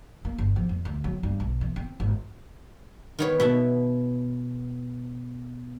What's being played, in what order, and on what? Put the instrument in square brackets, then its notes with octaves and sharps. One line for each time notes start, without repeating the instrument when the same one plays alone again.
[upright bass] A#3
G1
F3
F2
D2
F#3
G2
B1
E3
C4
G#1
[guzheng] D#3 B3 C#5
[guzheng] B2 E4 A5 [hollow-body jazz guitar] B3